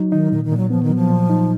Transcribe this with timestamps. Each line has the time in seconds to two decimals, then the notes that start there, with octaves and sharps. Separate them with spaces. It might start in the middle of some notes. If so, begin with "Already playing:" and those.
Already playing: F#3 D#4
0.12 D#3 D#4
0.32 A#2 D#3
0.45 D#3
0.52 A#2
0.57 F#3
0.70 F3 B3
0.83 D#3
0.90 F#3
0.95 F3
1.09 A#2
1.30 D#4